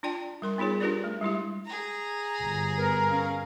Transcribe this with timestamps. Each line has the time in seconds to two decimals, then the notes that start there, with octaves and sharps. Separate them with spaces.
0.03 D4 F4 D5 G5 A5
0.42 G3 A#4 C6
0.58 B3 D#4 F4 G#4 C#5
0.80 D4 F4 G4 A#4 B4 D5
1.04 A3
1.21 G3 G#3 E4 G4
1.65 G#4 A#5
2.41 G1
2.77 B3 A#4
3.08 C#4 F5